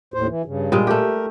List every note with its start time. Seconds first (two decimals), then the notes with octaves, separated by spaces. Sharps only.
0.14 D#2 A2 C5
0.28 E3
0.46 G2 C#3
0.72 A#2 G3 G#3
0.87 A3 G4 A#4